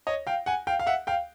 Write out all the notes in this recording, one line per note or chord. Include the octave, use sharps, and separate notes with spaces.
C#5 D#5
F5 G5
F#5 G#5
F5 G5
F5
E5 F#5
F5 G5